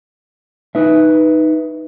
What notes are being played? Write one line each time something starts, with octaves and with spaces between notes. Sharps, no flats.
D#4 B4 E5